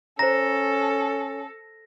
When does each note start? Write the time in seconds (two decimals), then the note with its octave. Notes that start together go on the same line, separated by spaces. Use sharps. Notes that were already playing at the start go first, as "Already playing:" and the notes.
0.19 C#4 A4 C5 A#5 A#6